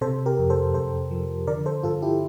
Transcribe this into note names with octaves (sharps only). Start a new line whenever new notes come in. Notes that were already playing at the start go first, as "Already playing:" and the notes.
C3 A4 C5
G4 A#4
F2
A4 C5
F2 A4 C5
F3
D3 A#4 D5
A4 C5
G2 F4 A4
E4 G4